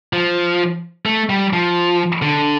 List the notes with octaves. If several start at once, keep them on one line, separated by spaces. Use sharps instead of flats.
F3
A3
G3
F3
D3